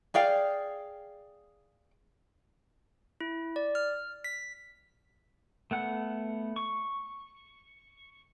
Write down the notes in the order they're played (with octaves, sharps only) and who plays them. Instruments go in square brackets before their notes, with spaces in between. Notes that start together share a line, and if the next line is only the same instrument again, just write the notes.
[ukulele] G#4 D5 F5 G5
[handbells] E4
D5
F6
B6
[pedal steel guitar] A3 B3 F#5
C#6